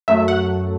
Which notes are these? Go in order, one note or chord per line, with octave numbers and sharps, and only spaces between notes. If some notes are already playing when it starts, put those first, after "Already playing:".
F#2 F#3 A3 E5
F#5